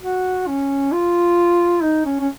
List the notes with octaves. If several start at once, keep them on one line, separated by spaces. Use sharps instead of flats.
F#4
C#4
F4
D#4
C#4
C#4